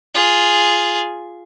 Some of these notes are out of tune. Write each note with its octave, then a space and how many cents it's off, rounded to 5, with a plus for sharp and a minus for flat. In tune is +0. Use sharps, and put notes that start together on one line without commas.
F4 +0 G#4 +0